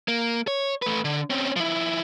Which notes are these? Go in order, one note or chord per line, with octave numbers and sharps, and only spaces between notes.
A#3
C#5
A3 B4
D3
C4 C#4
F3 E4